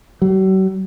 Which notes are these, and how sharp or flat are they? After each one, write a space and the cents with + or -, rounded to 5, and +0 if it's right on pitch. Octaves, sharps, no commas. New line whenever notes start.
F#3 +45